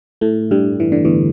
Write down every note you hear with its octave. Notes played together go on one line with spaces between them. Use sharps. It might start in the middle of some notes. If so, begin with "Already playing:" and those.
A2 A3
G2 G3
E3
D3
E2 E3